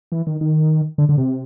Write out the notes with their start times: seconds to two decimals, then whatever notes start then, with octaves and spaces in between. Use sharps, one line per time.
0.12 E3
0.27 D#3
0.41 D#3
0.98 D3
1.09 D3
1.18 C3